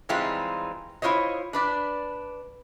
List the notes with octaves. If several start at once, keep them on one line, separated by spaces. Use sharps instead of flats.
E3 G3 G#3 C4 D#4 F4
E4 F4 C5 C#5 D#5
D4 B4 D5